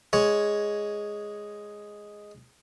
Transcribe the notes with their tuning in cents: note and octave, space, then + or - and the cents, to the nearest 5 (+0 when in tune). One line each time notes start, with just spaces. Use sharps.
G#3 +0 C#5 +5